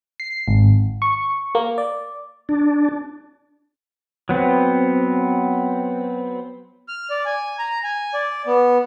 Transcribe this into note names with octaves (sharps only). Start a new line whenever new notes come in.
C7
G#1
C#6
A#3
D5
D4
F#3 B3 C4
F6
D5
G#5
A#5
G#5
D5
B3